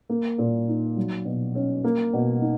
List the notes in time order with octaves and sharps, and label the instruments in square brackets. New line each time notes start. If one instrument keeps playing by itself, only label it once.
[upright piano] A#3
A#2
D#4
F#3
B2
C#4
A#3
B2
D#4